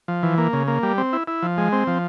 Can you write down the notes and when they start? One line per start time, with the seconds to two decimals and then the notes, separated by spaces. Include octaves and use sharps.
0.08 F3
0.23 E3
0.38 A#3
0.53 C#3
0.68 A#3
0.83 G3
0.98 C4
1.13 E4
1.27 E4
1.42 F3
1.58 G#3
1.72 C4
1.87 F3